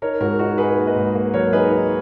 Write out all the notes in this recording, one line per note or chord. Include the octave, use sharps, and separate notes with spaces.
D#4 A#4 C#5
G#2 F#4 A#4
D#4 F#4 A#4
D#4 G#4 B4
A#3
B4 D#5
G#2
A#3
F#3 A#4 C#5
D#4 G#4 B4
D#4